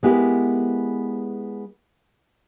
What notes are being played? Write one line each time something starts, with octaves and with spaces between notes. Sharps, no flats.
G#3 B3 E4 G4 A#4